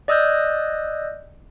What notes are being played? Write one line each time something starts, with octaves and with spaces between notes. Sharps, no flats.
D5 D#5 D#6 E6 F#6 G6